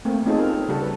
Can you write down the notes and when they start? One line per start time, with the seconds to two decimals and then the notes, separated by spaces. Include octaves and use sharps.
0.05 A3 A#3 C4
0.26 C4 C#4 D#4 F4 G#4 A4
0.38 C4 A#4
0.53 A4
0.68 C#3 G3 F#4 A4
0.82 B4